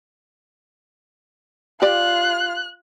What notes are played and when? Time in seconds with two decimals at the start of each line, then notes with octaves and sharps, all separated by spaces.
1.82 F4 G4 D5 F#6